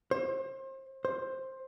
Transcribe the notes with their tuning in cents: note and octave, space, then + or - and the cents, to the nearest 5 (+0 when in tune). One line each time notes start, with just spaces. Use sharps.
C5 +30
C5 +10